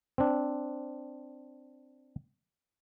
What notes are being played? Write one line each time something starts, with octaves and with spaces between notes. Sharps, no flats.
C4 D4